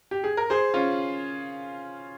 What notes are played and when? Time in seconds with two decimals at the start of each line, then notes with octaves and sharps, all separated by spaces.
0.11 G4
0.24 G#4
0.37 A#4
0.50 G#4 C5
0.74 C#4 F4